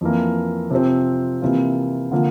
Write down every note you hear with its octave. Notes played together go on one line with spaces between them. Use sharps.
F2 E3 A#3
C3 F3 C4
C3 E3 A#3 F4
D3 F3 A#3 F4